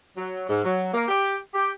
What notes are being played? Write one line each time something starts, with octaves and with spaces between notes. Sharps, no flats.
F#3
G#2
F#3
A#3
G4
G4